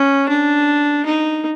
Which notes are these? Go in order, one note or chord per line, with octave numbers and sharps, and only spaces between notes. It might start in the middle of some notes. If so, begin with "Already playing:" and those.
Already playing: C#4
D4
D#4